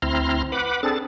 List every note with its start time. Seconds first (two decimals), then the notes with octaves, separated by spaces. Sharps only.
0.02 D2 C4 E4 A#5 C6 F6
0.52 B4 F#5 B5 D6
0.83 C4 D4 G#4 A4 A6